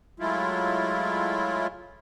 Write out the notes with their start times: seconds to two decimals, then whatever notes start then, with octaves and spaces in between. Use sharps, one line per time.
0.20 F#3 G#3 A3 E4 F4